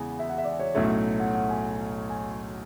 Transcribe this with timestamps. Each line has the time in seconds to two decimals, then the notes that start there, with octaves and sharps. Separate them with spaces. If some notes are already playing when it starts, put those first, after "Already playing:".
Already playing: E2 C#3 G#3 B3 G#5
0.19 E5
0.30 F#5
0.38 E5
0.44 D5
0.59 C#5
0.75 B1 A2 F#3 A3 C#4 E5
1.20 F#5
1.34 F#5
1.50 G#5
2.10 G#5